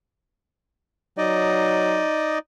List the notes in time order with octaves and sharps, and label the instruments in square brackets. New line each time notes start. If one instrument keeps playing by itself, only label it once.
[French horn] F#3 [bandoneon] D#4 D5 D#5